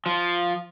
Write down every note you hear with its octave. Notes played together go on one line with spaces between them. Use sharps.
F3